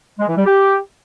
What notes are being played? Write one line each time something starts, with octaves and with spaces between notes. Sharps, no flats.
G#3
E3
G3
G4